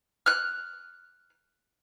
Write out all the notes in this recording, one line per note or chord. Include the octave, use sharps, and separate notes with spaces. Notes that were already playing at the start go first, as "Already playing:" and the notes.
F6 F#6